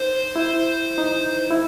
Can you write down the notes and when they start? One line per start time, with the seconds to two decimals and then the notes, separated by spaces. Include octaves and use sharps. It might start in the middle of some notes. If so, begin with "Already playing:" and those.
Already playing: D#4 C5
0.36 E4
0.98 D#4
1.50 E4